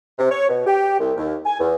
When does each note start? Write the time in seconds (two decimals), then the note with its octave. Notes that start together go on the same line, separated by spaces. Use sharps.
0.18 C3
0.31 C#5
0.49 B2
0.66 G4
0.99 C2
1.17 D#2
1.45 G#5
1.59 E2